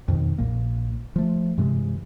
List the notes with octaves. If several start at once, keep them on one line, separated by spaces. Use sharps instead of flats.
F2 B2 D#3
A#1 A#2 A#3
F3 A3
G2 C3 E3 G#3